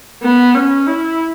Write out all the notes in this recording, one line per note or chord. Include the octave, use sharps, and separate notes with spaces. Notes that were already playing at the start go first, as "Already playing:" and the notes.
B3
C#4
E4